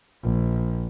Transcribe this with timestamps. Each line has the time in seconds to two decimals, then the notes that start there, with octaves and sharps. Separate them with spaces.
0.23 A#1